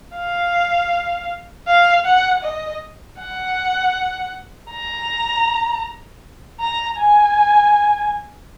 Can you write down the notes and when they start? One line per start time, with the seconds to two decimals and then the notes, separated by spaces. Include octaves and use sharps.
0.16 F5
1.68 F5
2.06 F#5
2.44 D#5
3.20 F#5
4.71 A#5
6.60 A#5
6.98 G#5